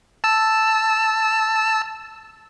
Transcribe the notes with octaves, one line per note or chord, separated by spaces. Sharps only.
A5 E6